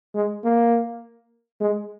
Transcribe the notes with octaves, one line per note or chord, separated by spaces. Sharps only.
G#3
A#3
G#3